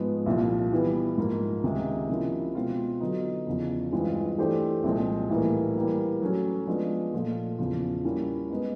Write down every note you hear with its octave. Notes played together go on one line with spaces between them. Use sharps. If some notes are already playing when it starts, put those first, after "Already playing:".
Already playing: G#2 F3 G#3 B3
C2 A#2 F3
E3 G3 B3 E4
G#2 F3 A#3
C#2 C3 D#3 G#3
C3 F3 A#3 C#4 E4
B2 G#3 C4 F4
D3 F#3 B3 D#4
E2 C#3 F3
G2 E3 G#3 C4 F4
E3 A3 D4 G4 C5
C2 A#2 F3 G#3 C4
A2 E3 G3 A#3
E3 G3 A#3
F#3 A3 C#4
F3 G#3 B3 D4
A#2 F3 A3
E2 C#3 F3
G3 A#3 C#4 E4
G#3 B3 D#4